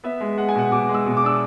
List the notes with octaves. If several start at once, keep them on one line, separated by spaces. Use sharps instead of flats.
B3 E5
G#3
G#3 F#5
G#5
B2 F#5
B2 D6
G#3
E6
B2
D6
D4 E6